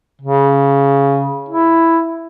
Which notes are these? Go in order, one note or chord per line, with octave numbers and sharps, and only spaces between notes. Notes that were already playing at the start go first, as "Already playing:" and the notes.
C#3
E4